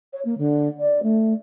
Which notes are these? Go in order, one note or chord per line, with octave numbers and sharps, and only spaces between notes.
C#5
A#3
D3
D5
A3